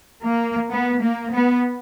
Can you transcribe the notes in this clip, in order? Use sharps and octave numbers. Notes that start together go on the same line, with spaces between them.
A#3
B3
A#3
B3